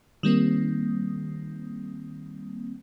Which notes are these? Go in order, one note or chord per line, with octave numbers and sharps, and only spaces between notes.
D#3 G3 A#3 C4